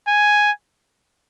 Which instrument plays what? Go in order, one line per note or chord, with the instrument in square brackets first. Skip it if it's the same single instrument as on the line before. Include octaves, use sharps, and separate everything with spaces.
[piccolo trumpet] G#5